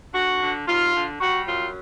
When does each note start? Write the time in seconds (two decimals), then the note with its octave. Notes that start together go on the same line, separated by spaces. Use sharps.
0.13 D3 F#4
0.40 D3
0.67 D#2 F4
0.94 D3
1.20 G3 F#4
1.47 F#2 F4